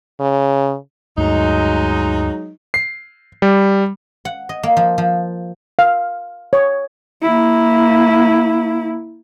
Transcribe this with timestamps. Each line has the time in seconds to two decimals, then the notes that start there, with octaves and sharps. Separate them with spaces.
0.20 C#3
1.18 D2 G2 F#3 G#3 A3 D#4
2.74 C7
3.42 G3
4.25 F#5
4.49 D#5
4.63 A#3
4.77 F3
4.98 F3
5.79 F5
6.53 C#5
7.22 A#3 E4